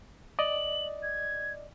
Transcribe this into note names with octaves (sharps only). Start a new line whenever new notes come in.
D5 D#5 F#7
G#6